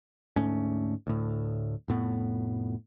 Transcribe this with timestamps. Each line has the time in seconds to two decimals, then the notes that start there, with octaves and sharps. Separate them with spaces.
0.36 D2 G#2 A3 C#4
1.07 D2 A2
1.88 F1 A2 B3